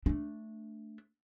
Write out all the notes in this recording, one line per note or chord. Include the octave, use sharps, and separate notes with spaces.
A3 D4